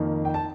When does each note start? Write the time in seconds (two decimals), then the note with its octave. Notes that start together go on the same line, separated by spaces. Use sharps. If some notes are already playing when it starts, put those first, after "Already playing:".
Already playing: F2 D#3 A#3
0.25 G5
0.34 A5